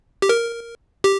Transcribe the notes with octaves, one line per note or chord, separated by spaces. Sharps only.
G4
A#4
G4